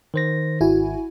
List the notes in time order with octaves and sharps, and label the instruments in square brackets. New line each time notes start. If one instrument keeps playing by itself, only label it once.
[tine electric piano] D#3 C5 A#6
[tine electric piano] G#1 [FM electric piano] E4 F#4 G#5